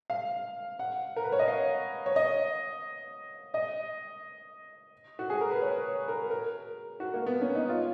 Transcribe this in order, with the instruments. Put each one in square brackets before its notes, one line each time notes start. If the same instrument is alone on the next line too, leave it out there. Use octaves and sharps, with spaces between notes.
[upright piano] F5
F#5
A#4
B4
C#5
D#5
F5
C#5
D#5
D#5
F#4
G#4
A#4
B4
C#5
A#4
A#4
F#4
A#3
B3
C#4
D#4
F4